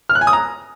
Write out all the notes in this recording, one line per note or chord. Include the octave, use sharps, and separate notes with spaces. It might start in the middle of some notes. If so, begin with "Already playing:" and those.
F6
F#6
G#5
D#6
A#5